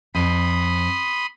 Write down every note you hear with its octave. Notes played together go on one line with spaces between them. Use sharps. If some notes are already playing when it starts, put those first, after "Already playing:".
F2 B5 C6 D#6